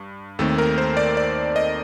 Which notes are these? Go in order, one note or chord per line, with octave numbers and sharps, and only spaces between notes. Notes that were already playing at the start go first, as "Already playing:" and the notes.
Already playing: G2
D#2 D#3 A3 C4 A4
A#4
C5
D5
D5
D#5